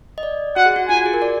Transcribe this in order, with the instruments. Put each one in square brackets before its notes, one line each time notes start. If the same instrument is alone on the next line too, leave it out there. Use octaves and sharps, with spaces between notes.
[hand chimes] D#5
D5
[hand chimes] F#4 [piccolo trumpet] F#5
[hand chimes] G#4
F#4
[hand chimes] F4 [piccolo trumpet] G#5
[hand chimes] F#4
G#4
A#4
D5